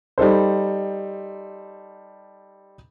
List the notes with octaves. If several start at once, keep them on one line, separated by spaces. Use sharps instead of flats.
G3 D#4 A4 C5